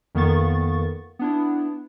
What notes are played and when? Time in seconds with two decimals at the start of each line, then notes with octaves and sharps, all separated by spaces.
0.15 F2 D#3 A#3 B3 C#6 A6
1.19 B3 D4 E4